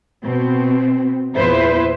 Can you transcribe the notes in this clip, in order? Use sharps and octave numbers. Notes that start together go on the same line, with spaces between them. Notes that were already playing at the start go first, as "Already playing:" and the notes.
B2 C4
E2 A#2 E4 B4 C5